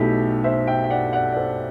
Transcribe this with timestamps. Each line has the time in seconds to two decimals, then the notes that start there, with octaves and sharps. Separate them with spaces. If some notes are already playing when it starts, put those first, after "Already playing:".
Already playing: B1 B2 A3 E4 G4
0.44 C5 E5
0.67 E5 G5
0.84 G5
0.90 D5 F#5
1.13 D5 F#5
1.32 D5
1.36 A4 C5